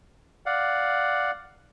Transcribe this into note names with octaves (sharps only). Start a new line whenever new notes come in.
D5 F5 F#5